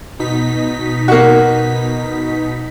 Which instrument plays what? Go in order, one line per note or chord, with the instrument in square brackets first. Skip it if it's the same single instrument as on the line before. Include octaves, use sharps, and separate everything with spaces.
[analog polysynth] B2 D#4 B6
[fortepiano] A#3 F#4